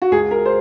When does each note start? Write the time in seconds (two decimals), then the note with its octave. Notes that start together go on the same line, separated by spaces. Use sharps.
0.02 F#4
0.11 C#2 G#4
0.31 A#4
0.45 C5